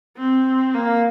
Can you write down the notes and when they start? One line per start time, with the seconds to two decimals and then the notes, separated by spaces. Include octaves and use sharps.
0.17 C4
0.74 A#3